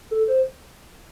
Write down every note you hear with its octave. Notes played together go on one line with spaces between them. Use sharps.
A4
C5